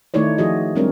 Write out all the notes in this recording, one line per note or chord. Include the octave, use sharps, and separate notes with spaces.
D#3 A3 D#4 E4 C#5 D5
F3 F4 F#4 G#4 D#5
G3 G#3 C4 D4 A#4 C#5